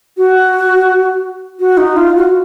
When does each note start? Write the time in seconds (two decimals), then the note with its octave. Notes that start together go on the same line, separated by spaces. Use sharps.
0.17 F#4
1.60 F#4
1.77 D#4
1.97 F4
2.15 F#4